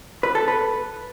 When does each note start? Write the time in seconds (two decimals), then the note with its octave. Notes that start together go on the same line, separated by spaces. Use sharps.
0.23 B4
0.35 A4
0.48 B4